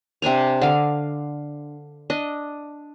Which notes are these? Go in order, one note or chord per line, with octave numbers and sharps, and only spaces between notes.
C3 D4 G#5 A#5
D3 F5
D4 D#5